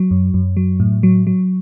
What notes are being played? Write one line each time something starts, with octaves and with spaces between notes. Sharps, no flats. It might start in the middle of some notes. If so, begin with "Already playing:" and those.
Already playing: F#3
F#2
F#2
F#3
A2
F#3
F#3